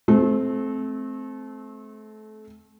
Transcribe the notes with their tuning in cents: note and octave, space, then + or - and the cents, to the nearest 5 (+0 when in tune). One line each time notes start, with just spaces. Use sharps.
A3 -30 C4 +0